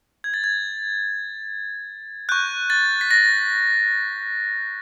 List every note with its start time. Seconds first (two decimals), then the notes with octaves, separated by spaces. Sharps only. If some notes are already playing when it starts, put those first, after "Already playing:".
0.24 G#6
0.34 A6
0.44 G#6
2.29 C#6 F#6 G6
2.70 A6
3.01 B6
3.11 A#6